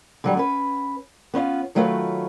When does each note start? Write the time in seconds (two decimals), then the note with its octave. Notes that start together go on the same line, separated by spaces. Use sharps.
0.24 D3 F#3 G3
0.37 C#4 B4
1.34 B3 C#4 D#4 F4
1.75 D#3 F#3 A3 F4 B4 C#5